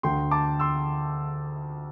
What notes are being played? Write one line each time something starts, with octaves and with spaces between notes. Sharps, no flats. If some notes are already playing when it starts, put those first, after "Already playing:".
D2 D3 G5 C6
A5 D6
C6 E6